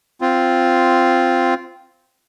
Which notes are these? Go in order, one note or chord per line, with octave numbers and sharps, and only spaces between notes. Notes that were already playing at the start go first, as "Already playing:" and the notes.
C4 F4